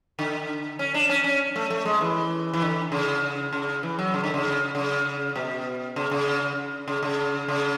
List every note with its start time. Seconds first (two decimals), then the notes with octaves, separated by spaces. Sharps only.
0.19 D3
0.79 C#4
0.94 D4
1.09 C#4
1.24 C#4
1.56 A3
1.70 A3
1.85 G#3
2.01 E3
2.54 E3
2.62 D3
2.92 C#3
3.53 C#3
3.83 E3
3.99 F#3
4.14 C#3
4.24 D3
4.34 C#3
4.75 C#3
5.36 B2
5.96 C#3
6.11 C#3
6.88 C#3
7.03 C#3
7.48 C#3